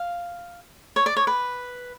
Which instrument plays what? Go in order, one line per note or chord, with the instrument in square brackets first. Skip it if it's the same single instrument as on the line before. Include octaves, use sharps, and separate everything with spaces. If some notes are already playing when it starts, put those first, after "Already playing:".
Already playing: [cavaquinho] F5
C#5
D5
C#5
B4